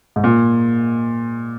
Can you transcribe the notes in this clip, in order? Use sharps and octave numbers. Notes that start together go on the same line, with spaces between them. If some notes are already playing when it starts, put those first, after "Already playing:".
G#2
A#2